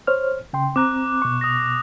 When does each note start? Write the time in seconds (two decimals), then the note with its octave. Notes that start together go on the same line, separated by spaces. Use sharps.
0.07 C5 C#5 F6
0.53 C#3 G5 C6
0.76 C4 A#5 D6 F#6
1.22 B2 C#6
1.41 D#6 A#6